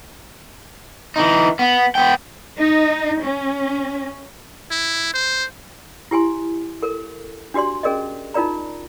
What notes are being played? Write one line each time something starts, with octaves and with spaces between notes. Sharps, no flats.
E3 D#4
B3
B3 G5
D#4
C#4
E4
C5
E4 G4 G#5 C6
A4 A#4
D4 F#4 G4 D5 C6
C#4 G#4 A#4 D5 D#5
D#4 F4 A#4 D5 A#5